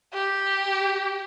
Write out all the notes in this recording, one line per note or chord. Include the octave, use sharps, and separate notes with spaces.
G4